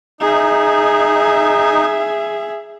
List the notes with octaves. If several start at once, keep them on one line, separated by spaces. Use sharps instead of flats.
D#4 G#4 E5